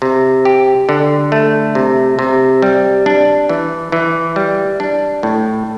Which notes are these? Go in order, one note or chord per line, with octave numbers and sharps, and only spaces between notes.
C3
G4
D3
A3
C3
C3
G3
D4
E3
E3
G3
D4
A2